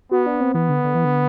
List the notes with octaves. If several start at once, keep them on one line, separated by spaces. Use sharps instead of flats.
B3 F#4
D4
C4
E3 B3
D3
D3
E3
D3